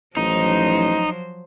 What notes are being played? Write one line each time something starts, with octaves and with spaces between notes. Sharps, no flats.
A1 F3 F#3 D#4 C5